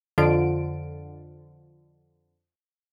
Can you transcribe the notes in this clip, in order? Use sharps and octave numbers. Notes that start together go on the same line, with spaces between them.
F2 D3 F4 D7